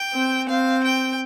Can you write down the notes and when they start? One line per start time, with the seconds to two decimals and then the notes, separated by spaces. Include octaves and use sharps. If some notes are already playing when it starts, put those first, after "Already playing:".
Already playing: G5
0.14 C4
0.48 C4 F5
0.84 G5